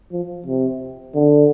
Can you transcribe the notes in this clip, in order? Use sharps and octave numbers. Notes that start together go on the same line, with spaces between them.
F3
C3
D3